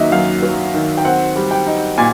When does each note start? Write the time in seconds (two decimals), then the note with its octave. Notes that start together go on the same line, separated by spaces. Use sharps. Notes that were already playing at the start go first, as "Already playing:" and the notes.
Already playing: D#3 F#3 A#3 D#5 E5
0.12 F#2 F5
0.43 F#3
0.74 D#3
0.97 G5
1.05 C4 F#5
1.36 G3
1.51 G5
1.67 D#4
1.98 A#2 G#5